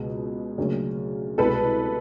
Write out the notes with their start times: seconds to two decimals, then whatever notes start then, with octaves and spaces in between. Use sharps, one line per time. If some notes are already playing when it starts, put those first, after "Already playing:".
Already playing: C#2 B2 G#3
0.58 D2 C#3 F#3 A#3
1.38 C2 B2 G#3 A4 B4